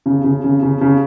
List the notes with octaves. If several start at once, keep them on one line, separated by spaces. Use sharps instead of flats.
C#3
C#3
C#3
C#3
C#3